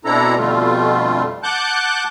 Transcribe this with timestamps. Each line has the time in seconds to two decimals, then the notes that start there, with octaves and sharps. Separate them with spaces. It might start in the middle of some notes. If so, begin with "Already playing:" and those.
0.05 B2 C4 D4 E4 A4 A#5
0.37 F2 B2 D3 G3 A3 F4
1.43 F#5 A5 D6 F#6 G6